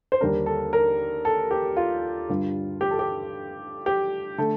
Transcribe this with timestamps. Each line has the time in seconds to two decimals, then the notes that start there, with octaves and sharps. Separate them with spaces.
0.12 C5
0.21 D#2 D3 G3 D4 A#4
0.46 A4
0.73 A#4
1.25 A4
1.51 G4
1.77 F4
2.29 G2 D3 G3 D4 F4
2.81 G4
2.91 A4
2.99 G4
3.86 G4
4.38 D3 A3 A4